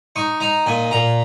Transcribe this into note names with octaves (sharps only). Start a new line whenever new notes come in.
D#4 C#6
D#4 A#5
A#2 G#5
A#2 A#5